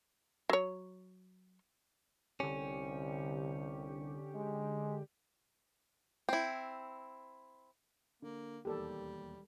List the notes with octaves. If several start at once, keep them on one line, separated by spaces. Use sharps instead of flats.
F#3 C#5
C2 D3 C#4 G4
G#3
C4 E4
D3 A#3
E1 D#2 G3 G4 A4 A#4 D5